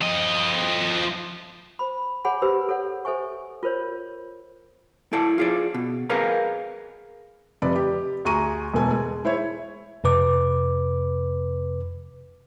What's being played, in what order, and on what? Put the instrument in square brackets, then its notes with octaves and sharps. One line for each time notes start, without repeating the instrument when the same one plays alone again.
[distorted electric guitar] F3 D#5
[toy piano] C5 B5
G#4 C#5 F#5 G#5 B5
G4 B4 C5 E6
A4 C#5 F#5
A4 C5 E5 G#5 C#6
F4 A#4 C5 C#5
[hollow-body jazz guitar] E4 A4 D5 A5
F4 G#4 D5
B2
G#4 A#4 B4 D#5 F5 A#5
[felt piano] F1 C3 B4 D5 B5
G4
D2 G#4 A#5 C#6 D#7
E1 B2 A3 G#5
G#3
G#3 E4 C5 C#5 E5
[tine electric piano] F2 C3 B4 D6